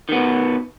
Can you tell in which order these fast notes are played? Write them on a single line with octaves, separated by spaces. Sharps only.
D#3 B3 B2